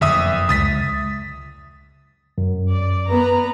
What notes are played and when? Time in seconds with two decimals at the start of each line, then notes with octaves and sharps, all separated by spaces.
0.01 F1 A#1 F#2 D3 E5 D#6
0.49 C#2 D#6 A6 B6
2.38 F#2
2.70 D5
3.08 B3 B4 A#5